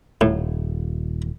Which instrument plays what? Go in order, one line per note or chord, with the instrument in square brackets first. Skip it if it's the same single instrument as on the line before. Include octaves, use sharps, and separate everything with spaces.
[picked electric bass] D#1 [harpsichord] A2